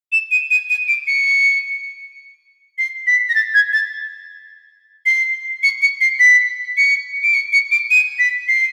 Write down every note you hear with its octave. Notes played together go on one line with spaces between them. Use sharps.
E7
D#7
D#7
D#7
D7
C#7
C7
B6
A#6
A6
G#6
A6
C7
C#7
C#7
C7
B6
C#7
D7
C#7
C#7
D7
D#7
B6
C7